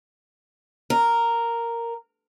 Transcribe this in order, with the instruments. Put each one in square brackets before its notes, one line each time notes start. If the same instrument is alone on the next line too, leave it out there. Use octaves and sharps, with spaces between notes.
[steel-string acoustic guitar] A#4